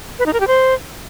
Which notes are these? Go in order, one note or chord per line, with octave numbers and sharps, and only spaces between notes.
B4
D#4
A#4
G4
C5